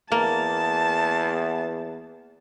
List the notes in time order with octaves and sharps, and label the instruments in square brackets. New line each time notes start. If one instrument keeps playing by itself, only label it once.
[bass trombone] E2 [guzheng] A#3 [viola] A5